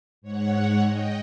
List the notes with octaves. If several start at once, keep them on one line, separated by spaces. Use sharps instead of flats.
G#2 C#5 F#5
D#5 G5